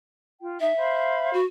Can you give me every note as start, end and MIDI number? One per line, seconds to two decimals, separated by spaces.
0.42 0.59 65
0.42 0.59 79
0.60 0.72 63
0.60 1.30 76
0.77 1.39 72
0.77 1.39 77
0.77 1.39 83
1.33 1.45 66